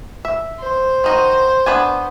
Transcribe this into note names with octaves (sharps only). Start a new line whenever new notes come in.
E5
C5
D#3 D#4 F#4
B3 D4 G#5